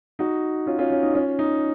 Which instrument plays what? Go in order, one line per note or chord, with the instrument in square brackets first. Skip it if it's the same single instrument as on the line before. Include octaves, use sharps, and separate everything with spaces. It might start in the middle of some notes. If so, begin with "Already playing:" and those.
[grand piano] D#4 F#4
C#4 F4
C#4 F4
C#4
D#4
C#4 F4
D#4